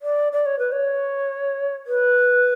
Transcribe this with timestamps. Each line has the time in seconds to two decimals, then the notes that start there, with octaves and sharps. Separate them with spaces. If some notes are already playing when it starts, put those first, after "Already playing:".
0.02 D5
0.33 D5
0.46 C#5
0.59 B4
0.72 C#5
1.87 B4